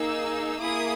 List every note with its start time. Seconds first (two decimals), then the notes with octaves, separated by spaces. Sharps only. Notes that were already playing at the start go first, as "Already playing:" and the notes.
Already playing: A#3 D#4 G#4 E6
0.60 A#3 E4 G#4 D#6